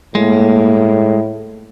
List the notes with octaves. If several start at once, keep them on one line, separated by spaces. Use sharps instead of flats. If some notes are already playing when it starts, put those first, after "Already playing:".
A2 G#3 A#3